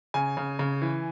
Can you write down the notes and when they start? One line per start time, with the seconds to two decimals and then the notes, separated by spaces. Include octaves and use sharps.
0.14 C#3 G#5
0.37 C#3
0.59 C#3
0.82 E3